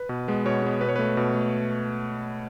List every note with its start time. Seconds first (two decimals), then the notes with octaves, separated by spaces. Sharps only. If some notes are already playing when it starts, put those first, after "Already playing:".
Already playing: B4
0.09 B2
0.28 G#3 B3
0.46 B2 C#5
0.62 G#3 B3
0.81 B2 B4
0.89 C#5
0.96 A3 B4
1.17 B2
1.35 A3